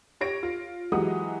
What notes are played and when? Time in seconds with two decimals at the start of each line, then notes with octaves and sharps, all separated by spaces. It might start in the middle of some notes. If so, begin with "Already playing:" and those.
0.21 G4 C#5 A#6 D7
0.43 F4
0.92 E3 F#3 G#3 G4 F#5 D#6